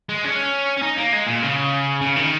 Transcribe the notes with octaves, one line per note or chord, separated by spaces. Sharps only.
G#3
C#4
C#4
D#4
A#3
G#3
A#2
C#3
C#3
D#3